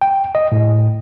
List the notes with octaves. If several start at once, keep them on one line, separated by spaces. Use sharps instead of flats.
G5
D#5
A2